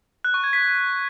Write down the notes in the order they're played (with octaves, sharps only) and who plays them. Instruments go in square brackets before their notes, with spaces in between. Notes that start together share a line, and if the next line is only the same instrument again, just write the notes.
[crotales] F#6
C#6
G#6
B6